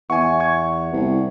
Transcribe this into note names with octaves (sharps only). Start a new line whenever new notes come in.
E2 E5 F#5 G#5 C#6
C#6 G#6
C2